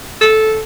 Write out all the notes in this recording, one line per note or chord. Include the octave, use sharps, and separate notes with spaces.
A4